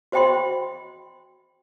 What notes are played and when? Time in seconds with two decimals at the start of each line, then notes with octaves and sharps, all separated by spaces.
0.12 F#4 C5 D#5 G5 B5 C6